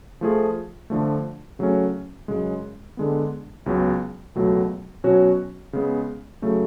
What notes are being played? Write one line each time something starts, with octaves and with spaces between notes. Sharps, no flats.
F3 A3 F4 G#4
D3 F3 A3
C#3 F#3 A3 C#4
F#2 C#3 G#3
D3 G#3 B3
C#2 C#3 F#3 B3
C#2 B2 F#3 A3
B2 F#3 C#4 F#4 C#5
C#3 G#3 B3
C#3 F#3 A3